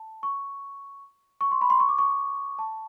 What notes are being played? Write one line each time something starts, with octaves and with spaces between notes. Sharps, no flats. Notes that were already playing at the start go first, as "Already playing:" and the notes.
Already playing: A5
C#6
C#6
C6
B5
C6
C#6
D6
C#6
A5